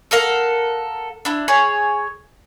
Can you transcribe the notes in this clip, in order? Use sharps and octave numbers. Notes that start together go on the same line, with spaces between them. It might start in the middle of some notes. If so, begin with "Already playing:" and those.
A4 A#4 F5 F#5
D4 E4
G#4 C#5